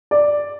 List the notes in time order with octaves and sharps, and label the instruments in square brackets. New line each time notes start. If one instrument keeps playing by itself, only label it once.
[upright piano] D5